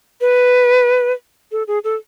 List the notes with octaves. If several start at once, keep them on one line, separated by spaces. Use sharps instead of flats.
B4
A4
G#4
A4